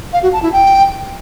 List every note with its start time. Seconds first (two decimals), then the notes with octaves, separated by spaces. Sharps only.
0.13 F5
0.23 F#4
0.33 A5
0.42 E4
0.52 G5